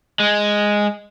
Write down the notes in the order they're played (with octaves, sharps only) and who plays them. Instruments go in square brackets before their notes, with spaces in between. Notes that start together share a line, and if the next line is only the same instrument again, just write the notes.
[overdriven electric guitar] G#3